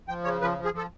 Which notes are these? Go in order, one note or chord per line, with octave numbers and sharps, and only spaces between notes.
F3 G5
C#3 C#5
F3 B4
F3
G#4
F3 A4